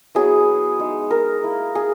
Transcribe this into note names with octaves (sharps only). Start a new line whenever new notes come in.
F#3 B3 E4 G#4
G#3 D#4
A#4
A#3 E4
G#4